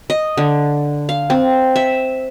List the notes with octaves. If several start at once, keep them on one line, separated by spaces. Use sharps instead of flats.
D#5
D3
F5
C4
E5